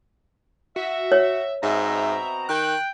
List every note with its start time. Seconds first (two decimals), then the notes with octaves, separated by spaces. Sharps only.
0.76 F#4 E5
1.12 C#5
1.63 G#2 B2 C4 E5 A#5
2.49 D#3 G5 F#6